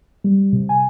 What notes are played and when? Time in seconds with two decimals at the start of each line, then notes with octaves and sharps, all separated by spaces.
0.24 G3
0.53 C3
0.69 G#5